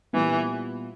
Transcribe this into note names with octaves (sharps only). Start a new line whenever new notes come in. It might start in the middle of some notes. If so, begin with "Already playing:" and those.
A#2 E3 G3 B3